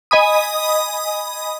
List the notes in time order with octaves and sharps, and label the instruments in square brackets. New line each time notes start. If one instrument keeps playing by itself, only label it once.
[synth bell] D#5 G#5 B5 D#6